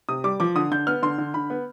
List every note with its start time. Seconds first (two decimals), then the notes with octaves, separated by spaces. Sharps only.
0.08 C3 D#6
0.24 G3 D6
0.40 F3 D6
0.55 D3 D#6
0.71 D3 G6
0.87 B3 F6
1.02 D3 C6
1.18 D3
1.34 D3 B5
1.50 B3